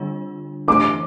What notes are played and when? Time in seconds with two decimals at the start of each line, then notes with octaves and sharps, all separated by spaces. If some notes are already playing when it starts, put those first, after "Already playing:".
Already playing: D3 G3 D4 F4
0.68 E3 A3 D4 G4 D6